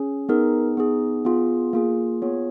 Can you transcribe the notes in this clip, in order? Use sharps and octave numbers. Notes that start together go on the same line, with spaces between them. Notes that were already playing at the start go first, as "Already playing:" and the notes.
Already playing: C#4 G#4
B3 D#4 G#4 A#4
B3 D#4 G#4
B3 F4 G#4
A#3 F4 G#4
B3 F4 G#4 C#5